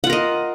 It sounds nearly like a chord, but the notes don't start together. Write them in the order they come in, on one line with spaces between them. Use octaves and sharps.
F#5 F4 A#4 D#5